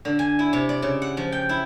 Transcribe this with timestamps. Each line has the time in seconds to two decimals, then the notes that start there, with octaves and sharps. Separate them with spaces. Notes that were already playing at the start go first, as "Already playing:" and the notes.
0.05 D3
0.19 G#5
0.39 E4
0.53 C3
0.69 D5
0.82 C#3
1.02 F#5
1.17 F3
1.32 G5
1.49 E4